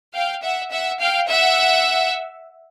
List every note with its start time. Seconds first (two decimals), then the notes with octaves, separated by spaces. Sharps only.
0.14 F5 G5
0.42 E5 F#5
0.71 E5 F#5
1.00 F5 G5
1.29 E5 F#5